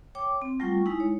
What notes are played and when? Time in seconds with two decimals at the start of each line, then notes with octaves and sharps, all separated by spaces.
0.15 C#5 G5 D6
0.42 C4
0.60 F#3 G3 A3 F4 G5 C#6
0.86 G#3 D#4 E4
1.00 C#5